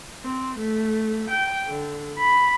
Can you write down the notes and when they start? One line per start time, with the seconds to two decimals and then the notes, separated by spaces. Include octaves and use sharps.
0.24 C4
0.59 A3
1.31 G5
1.68 D3
2.19 B5